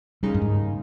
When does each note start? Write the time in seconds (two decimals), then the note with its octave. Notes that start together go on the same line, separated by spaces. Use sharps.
0.23 D#2 C#3 G3 G#3 D#4
0.34 G2
0.41 G#2